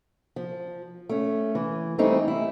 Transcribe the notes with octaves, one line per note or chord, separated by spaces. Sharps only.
F3
A3 C#4
E3
E3 G3 A3 C4 D#4
E4